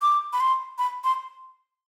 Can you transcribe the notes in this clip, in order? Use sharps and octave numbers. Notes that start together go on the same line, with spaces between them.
D6
B5
C6
B5
C6